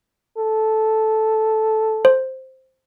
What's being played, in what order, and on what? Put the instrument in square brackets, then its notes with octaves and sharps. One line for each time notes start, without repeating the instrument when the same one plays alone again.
[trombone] A4
[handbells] C5